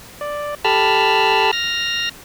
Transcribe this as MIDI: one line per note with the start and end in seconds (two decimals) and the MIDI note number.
0.21 0.55 74
0.65 1.51 67
0.65 1.51 69
0.65 1.51 81
0.65 1.51 83
0.65 1.51 88
0.65 1.51 89
1.53 2.09 89
1.53 2.09 94